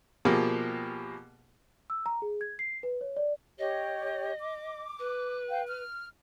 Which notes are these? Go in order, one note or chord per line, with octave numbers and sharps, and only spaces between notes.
B2 F3 A#3 G4 G#4
E6
A#5
G#4
G#6
C7
B4
C#5
D5
G4 C#5 D#5
D6
B4
F5 G5
F6